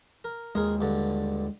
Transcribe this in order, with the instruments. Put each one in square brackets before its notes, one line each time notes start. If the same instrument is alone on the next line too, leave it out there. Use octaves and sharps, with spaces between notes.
[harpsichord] A#4
[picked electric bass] D#2 G#3 [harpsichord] G#4 A#4 D#5
[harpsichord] G2 D3